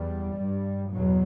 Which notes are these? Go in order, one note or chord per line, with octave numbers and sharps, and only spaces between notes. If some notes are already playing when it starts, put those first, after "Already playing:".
Already playing: E2 G3
G2
E2 B2 F#3